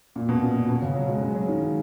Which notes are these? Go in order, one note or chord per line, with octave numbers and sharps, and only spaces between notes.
A#2
B2
A#2
A#2
B2
C#3
F#3
G#3
G#3
F#3
D#3
D#3